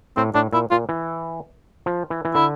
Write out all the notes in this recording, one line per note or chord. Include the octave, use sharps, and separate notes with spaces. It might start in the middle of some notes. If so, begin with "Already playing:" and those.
A2 C4
A2 D4
A#2 E4
A#2 F4
E3
F3
E3
E3
D3 E4